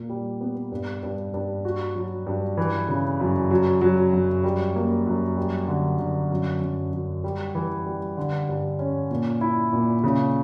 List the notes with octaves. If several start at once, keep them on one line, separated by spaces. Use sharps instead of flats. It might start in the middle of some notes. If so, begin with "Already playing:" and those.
Already playing: A#2 A#3
G3
B3
G2
G2
G2
F#4
F#3
G2
E3
C#3
F#2
F#3
F#3
F#2
G3
A#3
F#2
G3
D3
D3
F#2
F#2
F#2
G3
E3
G3
D3
G2
C#4
A#2
E4
A#2
C#3